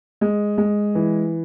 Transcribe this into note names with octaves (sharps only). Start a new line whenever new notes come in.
G#3
G#3
E3